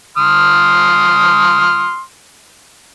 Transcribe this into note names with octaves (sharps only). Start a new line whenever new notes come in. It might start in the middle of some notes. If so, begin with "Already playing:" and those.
C6 D#6 F6